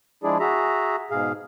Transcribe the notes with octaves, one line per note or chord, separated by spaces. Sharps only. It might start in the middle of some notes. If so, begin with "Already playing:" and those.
F3 G#3 D4 E4 G#4 D5
F#4 G#4 E5 A#5
G#2 B2 G#4 F5